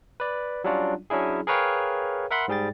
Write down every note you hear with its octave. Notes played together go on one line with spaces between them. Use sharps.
B4 D5
F#3 G3 C#4 D4 F4 F#4
F#3 C#4 D4 E4 G#4
G#4 A#4 B4 C#5 F5 G5
A#4 E5 F#5 B5 C6
G#2 G3 G#4 G5 A6